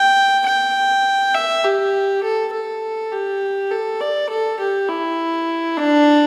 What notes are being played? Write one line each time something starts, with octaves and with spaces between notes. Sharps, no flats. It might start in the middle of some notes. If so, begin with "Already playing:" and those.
Already playing: G5
G5
E5
G4
A4
A4
G4
A4
D5
A4
G4
E4
D4